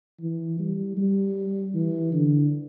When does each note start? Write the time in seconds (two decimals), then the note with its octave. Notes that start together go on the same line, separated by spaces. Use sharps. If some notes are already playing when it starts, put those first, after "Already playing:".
0.21 E3
0.60 G3
0.97 G3
1.74 E3
2.13 D3